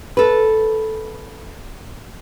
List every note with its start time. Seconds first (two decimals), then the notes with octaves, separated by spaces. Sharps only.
0.17 A4 B4